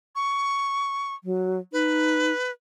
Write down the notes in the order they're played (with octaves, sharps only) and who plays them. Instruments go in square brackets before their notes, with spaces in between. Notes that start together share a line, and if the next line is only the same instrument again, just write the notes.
[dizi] C#6
[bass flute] F#3
[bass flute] D#4 [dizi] B4